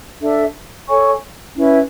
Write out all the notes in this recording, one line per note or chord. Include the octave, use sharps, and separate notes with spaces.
D4 A4 E5
A4 C#5 G#5 C#6
C#4 E4 B4